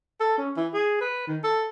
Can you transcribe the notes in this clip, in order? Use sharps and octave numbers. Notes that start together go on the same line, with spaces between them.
A4
C#4
E3
G#4
B4
D#3
A4